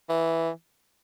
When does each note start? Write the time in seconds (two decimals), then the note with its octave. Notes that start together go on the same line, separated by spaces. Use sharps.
0.09 E3